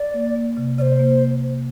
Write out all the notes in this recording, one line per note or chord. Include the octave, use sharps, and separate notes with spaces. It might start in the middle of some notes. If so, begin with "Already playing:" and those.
Already playing: D5
A#3
A#3
C3
C3 C5 D5
A#3